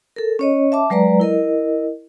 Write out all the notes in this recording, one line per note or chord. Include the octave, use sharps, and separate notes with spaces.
A4 A#4
C#4 C#5 D#5
E5 A5 D6
F#3 G#3 B4 D5 A#5
E4 A#4 D#5